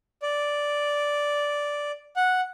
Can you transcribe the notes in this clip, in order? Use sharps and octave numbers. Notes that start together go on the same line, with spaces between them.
D5
F#5